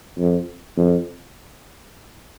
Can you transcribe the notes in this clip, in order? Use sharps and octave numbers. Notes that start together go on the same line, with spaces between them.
F2
F2